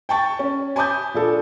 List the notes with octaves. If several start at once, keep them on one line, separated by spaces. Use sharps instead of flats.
G5 A5 C#6 A6
C#4
G#5 A5 B5 D6 D#6 G6
A#2 D4 A4